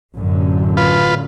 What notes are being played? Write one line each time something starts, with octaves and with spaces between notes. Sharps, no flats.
A1 F#2 D3
F4 B4